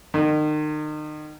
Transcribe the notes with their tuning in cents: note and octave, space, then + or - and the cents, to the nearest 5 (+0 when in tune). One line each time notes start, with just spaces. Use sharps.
D#3 -35